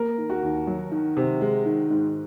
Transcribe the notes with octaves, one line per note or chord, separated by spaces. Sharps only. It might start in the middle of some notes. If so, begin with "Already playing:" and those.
Already playing: A#3 A#4
D#3
F#4
D#2
F#3
D#3
C3
G#3
D#3
G#2